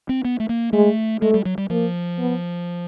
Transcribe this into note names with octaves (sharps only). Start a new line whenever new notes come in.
C4
B3
A3
A#3
G#3 A3
G#3 A3
G3
F#3
G3
F3 A#3
B3